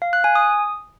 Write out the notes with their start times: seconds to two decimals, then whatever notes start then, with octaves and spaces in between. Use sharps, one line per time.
0.02 F5
0.13 F#6
0.24 G#5
0.35 D#6